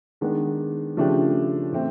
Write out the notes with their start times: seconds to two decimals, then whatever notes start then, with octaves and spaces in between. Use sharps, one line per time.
0.21 D#3 G#3 B3 D4
0.97 C#3 F3 A3 D4 G4
1.72 A2 E3 A3 C4